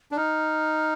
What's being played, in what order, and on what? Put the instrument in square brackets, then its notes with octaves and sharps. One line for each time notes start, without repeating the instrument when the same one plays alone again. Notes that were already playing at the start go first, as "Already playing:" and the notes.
[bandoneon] D4
[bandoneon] D#4 [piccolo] F6